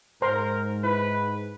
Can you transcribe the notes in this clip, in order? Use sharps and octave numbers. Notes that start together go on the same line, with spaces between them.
G#2 A#4 C5 A#5 C6
E4 B4